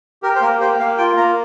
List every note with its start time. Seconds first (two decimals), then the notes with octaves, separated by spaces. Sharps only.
0.23 G4 A#4
0.36 C5
0.41 A#3 A#4
0.60 G4 C5
0.79 A#3 F5
0.98 F4 G5
1.17 A#3 A#5